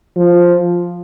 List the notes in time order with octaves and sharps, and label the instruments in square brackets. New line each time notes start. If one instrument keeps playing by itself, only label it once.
[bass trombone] F3